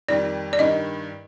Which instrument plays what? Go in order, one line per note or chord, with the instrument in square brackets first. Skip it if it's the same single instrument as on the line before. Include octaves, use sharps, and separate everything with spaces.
[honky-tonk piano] F2 D#3 G3 [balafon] D5
[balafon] D5
[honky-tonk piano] G2 D#3 G3 [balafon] D#5